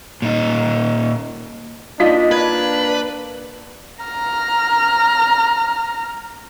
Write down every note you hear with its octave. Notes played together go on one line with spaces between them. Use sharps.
A#2 D#4
A#3 D4 D#4 F4 D#5 B6
B4 G#6
A#5 F6